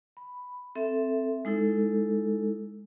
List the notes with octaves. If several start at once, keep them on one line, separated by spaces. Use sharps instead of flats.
B5
C4 A4 E5
G#3 D#4 E4 A4